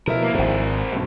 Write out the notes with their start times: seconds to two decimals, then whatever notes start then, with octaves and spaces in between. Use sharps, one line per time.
0.07 B2 F3 E4 A#4 E5
0.22 A#3
0.35 G#1 G#2 C4 A#4
0.92 B1 G2